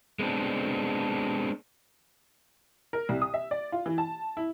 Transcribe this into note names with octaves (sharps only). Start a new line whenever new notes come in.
G#3 B3 C4 D4
A#4
C2
D#6
E5
D5
F4
E3
A5
E4